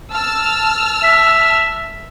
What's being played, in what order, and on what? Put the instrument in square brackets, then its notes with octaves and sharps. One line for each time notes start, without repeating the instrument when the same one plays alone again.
[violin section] A5 E6 F6
[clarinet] E5